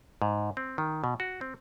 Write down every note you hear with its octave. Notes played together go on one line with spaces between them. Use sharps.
G#2
C4
D#3
B2
F#4
C4